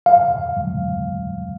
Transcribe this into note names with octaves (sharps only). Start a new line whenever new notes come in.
F5